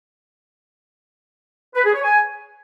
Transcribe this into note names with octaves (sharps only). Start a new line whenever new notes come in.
B4
G#4
C#5
G#5